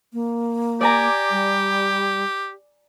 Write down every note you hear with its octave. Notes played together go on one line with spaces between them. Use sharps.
A#3
G4 D5 G#5 A#5
G3